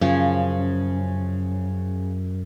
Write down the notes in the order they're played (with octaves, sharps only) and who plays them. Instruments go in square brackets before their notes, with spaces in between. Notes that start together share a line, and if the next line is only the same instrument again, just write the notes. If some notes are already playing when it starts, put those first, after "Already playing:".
[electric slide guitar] F#2 [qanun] C#3 F3 C#4